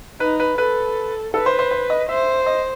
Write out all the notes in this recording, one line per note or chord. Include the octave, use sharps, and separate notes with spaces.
D#4 B4
B4
A4 B4
A4 B4
C5
C5
C5
D#5
C5 E5
D#5